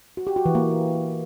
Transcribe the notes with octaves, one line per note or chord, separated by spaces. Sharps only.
F#4
G4
F#4
E3
A#3